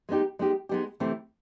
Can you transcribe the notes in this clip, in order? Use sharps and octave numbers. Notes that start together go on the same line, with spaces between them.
G#3 B3 D#4 G4
G#3 B3 D#4 G4
G#3 B3 D#4 G4
C3 E3 A3 C4 E4